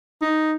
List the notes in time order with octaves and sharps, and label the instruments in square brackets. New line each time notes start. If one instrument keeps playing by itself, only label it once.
[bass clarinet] D#4